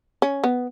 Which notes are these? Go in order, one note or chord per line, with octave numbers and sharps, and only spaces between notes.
C#4
B3